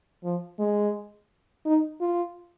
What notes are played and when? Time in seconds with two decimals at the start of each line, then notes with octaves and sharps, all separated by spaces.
0.24 F3
0.59 G#3
1.66 D#4
2.01 F4